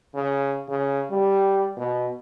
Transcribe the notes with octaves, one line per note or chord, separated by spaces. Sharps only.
C#3
C#3
G3
B2